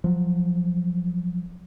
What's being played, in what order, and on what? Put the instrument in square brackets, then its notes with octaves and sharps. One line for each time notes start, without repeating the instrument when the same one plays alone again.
[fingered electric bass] F3 F#3